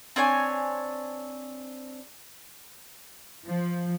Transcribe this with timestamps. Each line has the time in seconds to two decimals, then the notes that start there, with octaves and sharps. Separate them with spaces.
0.16 C4 D4 C#5 G#5
3.46 F3